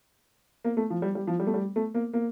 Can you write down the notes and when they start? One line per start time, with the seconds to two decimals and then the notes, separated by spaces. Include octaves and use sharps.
0.65 A#3
0.77 A3
0.90 F3
1.02 G3
1.15 G3
1.27 F3
1.40 G3
1.47 A3
1.54 G3
1.76 A3
1.95 A#3
2.13 A#3